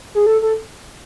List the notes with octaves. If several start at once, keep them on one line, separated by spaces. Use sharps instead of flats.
G#4
A4
A4